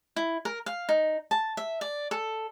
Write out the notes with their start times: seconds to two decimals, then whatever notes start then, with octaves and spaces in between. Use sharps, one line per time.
0.16 E4
0.45 A#4
0.66 F5
0.89 D#4
1.31 A5
1.57 E5
1.81 D5
2.11 A4